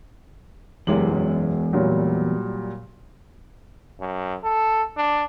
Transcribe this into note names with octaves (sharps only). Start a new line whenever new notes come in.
F#1 E2 G#3 G4 F#7
F#2
A#2 F#3 G3
F#2
A4
D4